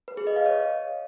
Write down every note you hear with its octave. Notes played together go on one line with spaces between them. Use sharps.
B4
G#4
D#5
F5
C#5